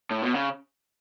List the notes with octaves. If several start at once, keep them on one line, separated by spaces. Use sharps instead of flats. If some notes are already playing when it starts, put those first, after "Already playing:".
A2
B2
C#3